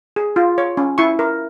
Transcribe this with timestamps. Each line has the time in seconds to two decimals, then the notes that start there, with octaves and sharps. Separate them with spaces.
0.16 G#4
0.36 F4
0.58 C#5
0.77 C#4
0.98 E4 C#6
1.19 A#4